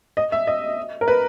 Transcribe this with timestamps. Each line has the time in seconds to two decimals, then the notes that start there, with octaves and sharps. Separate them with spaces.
0.17 D#5
0.32 E5
0.47 D#5
1.01 A#4
1.08 B4